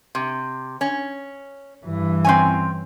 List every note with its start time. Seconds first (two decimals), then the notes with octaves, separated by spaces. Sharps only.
0.15 C3
0.81 C#4
1.85 G2 E3
2.25 C4 C#4 G#5